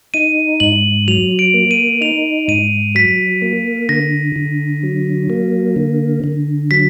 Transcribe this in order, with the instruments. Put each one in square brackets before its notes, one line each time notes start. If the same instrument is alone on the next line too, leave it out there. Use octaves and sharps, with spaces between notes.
[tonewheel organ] D#4 [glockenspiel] D#7
[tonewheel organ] G#2 [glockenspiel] F#7
[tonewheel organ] F#3 [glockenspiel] F7
[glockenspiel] D7
[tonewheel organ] A#3
[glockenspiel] D#7
[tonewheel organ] D#4 [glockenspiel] F7
[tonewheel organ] G#2 [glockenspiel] D#7
[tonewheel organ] F#3 [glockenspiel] B6
[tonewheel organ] A#3
[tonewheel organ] D3 [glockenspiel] A#6
[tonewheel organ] D3
F#3
A#3
D3
D3
[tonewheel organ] F#3 [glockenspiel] B6